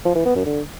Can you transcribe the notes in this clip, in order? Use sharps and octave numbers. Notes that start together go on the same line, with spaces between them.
F3
E3
B3
F#2
D3